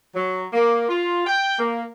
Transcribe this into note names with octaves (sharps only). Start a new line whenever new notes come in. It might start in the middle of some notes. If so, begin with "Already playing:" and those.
F#3
A#3
F4
G5
A#3